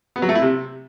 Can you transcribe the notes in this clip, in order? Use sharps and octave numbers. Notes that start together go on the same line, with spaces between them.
B3
F#3
A3
E4
C3